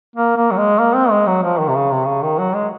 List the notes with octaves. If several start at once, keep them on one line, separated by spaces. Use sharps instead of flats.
A#3
A#3
F#3
G#3
A#3
C4
G#3
F#3
F3
D#3
C3
C#3
C3
C#3
D#3
F#3
G#3